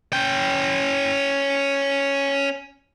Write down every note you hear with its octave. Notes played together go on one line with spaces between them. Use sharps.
C#4 G5